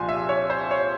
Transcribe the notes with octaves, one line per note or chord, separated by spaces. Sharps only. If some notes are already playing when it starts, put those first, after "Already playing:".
Already playing: C2 A#2 F3 G#5 C6
E5
C#5
C5
C#5